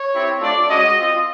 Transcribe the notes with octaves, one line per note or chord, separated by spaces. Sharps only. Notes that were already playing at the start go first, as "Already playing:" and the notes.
Already playing: C#5
C4 E4 G4
A3 D4 F4 D5
G#3 C#4 F#4 D#5
C4 F4